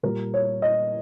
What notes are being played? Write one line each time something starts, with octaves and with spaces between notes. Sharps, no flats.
A#2 G3 A#4
C#5
D#5